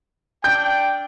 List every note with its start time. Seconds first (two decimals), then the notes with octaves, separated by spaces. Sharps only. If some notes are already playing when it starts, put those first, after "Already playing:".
0.44 D4 G5 G6